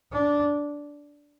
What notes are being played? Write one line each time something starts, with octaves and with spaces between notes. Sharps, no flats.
D4